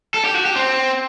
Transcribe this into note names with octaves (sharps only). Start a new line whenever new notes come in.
A4
G4
F#4
G4
C4